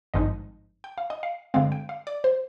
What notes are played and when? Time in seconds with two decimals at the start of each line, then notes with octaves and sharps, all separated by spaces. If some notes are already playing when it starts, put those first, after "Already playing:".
0.14 G#1 G2 F3 G#3 D#4 D#5
0.84 G5
0.98 F5
1.10 D#5
1.23 F5
1.54 G2 D3 G#3 C4 F5
1.72 G5
1.89 F5
2.07 D5
2.24 C5